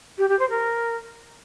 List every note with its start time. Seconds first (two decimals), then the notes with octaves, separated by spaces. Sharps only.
0.18 G4
0.29 G4
0.39 C5
0.50 A#4